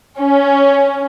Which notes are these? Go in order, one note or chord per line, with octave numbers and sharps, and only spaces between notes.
C#4